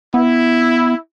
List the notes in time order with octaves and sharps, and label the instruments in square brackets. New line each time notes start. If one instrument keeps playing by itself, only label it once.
[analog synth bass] B3 [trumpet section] E4